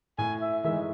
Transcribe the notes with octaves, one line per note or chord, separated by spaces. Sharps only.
A2 G#5
E5
E3 G#3 D#4 E5